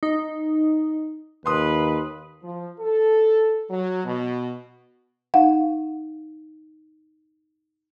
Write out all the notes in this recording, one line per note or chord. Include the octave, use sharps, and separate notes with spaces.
D#4
D#2 B4 C6 D#6
F3
A4
F#3
B2
D#4 F5 F#5